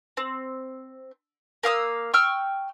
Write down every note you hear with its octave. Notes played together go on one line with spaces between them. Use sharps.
C4
A#3 F5 D#6 E6
G5 C#6 E6 F6